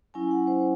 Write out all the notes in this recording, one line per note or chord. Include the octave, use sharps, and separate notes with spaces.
F#3 C#4 E4 G#5
F#5
C5